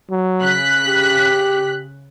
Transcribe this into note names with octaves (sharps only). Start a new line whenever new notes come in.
F#3
C#3 F#6 B6
G4